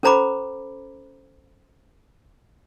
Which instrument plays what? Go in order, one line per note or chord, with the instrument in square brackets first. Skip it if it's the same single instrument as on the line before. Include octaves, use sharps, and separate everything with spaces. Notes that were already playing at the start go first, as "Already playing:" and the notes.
[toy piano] C#4 A4 C5 A#5 B5 D6